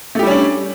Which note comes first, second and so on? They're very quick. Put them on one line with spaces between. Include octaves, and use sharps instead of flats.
A3 G4 G3 C#4 D4